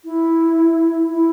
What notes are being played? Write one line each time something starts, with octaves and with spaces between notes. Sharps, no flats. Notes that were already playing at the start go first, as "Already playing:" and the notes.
E4
E4